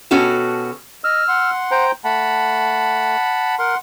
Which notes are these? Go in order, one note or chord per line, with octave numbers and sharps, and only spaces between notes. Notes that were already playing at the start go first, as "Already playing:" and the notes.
B2 C#4 F#4 G4 A4
D#5 E6 F6
F#5 C6
C5 G5 A#5
A3 F#5 A5 B5
A#4 F#5 C6